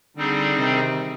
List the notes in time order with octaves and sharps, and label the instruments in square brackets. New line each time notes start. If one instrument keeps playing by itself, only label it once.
[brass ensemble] D3 [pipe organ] G3 C4 D#4 G#4
[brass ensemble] C3 D#3